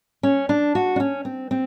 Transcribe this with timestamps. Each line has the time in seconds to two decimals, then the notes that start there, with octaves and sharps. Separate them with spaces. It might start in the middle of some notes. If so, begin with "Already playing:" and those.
0.23 C#4
0.49 D4
0.75 F#4
0.96 D4
1.00 C#4
1.25 C4
1.51 C4